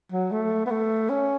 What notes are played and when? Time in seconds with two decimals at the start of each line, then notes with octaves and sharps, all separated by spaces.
0.12 F#3
0.32 A3
0.66 B3
0.71 A3
1.09 C#4